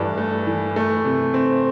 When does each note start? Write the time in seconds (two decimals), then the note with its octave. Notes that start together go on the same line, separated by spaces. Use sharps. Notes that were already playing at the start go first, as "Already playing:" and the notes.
Already playing: G2 E3 A3 D4
0.18 A3
0.47 E3
0.76 A3
1.05 C3
1.34 C4